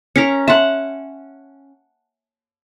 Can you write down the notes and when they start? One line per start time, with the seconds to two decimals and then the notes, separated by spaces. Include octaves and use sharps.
0.16 C#4 A#4 B6 C#7
0.48 E5 F#5 A5 C6